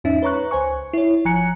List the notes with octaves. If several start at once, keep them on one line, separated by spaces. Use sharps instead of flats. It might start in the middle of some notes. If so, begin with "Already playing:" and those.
E2 G#2 C#4 D#4 E5
B4 C#5 A#5 C#6 F#6
C#2 C5 G#5 C#6
E4 C#5
G#1 F3 G#5 A#5 F#6 C#7